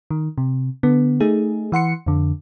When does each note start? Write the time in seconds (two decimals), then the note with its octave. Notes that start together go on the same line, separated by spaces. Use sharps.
0.11 D#3
0.38 C3
0.83 D3 B3
1.20 A3 D#4 G#4
1.72 E3 F#5 C6 C#7
2.06 F2 D3